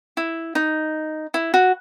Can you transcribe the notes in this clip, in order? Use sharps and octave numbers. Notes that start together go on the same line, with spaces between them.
E4
D#4
E4
F#4